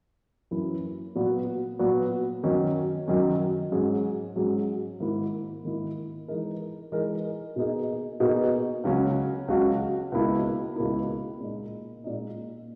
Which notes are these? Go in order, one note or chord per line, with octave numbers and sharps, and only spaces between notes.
F#2 E3 A#3 C#4 E4
A#2 F#3 B3 F#4
A#2 F#3 B3 F#4
F#2 D#3 F#3 C#4
F#2 D#3 F#3 C#4
G#2 F#3 C#4 G#4
G#2 F#3 C#4 G#4
G#2 D#3 A#3 E4
G#2 D#3 A#3 E4
E3 G#3 D#4 A#4
E3 G#3 D#4 A#4
B2 A#3 D#4 G#4
B2 A#3 D#4 G#4
C#2 C#3 F#3 C#4 F#4
C#2 C#3 F#3 C#4 F#4
C#2 B2 A#3 E4
C#2 B2 A#3 E4
A#2 G#3 D#4
A#2 G#3 D#4